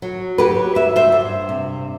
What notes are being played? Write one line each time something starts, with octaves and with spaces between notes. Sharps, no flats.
F#3
F#3 G4 B4
G2 E5
C5 E5
G2
C3